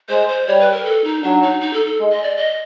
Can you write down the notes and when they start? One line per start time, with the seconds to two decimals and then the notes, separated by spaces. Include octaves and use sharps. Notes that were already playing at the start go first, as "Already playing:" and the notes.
0.09 G#3 C5
0.29 C5
0.47 G3 C#5
0.60 B4
0.72 A#4
0.85 A4
1.04 D#4
1.23 F#3 D4
1.42 D#4
1.61 D#4
1.73 A4
1.86 A4
1.99 G#3
2.12 D#5
2.23 D5
2.37 D#5